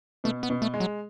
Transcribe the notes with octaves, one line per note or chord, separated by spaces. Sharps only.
B2 A3
B3
B2
A3
G#3
F#3